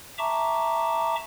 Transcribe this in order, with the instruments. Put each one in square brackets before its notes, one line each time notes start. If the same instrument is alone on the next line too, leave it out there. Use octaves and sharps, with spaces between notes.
[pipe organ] E5 A5 A#5 C#6 D6